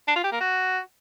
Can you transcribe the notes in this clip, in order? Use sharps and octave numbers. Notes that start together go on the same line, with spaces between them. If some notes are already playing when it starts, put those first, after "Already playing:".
D4
F4
G4
A#3
F#4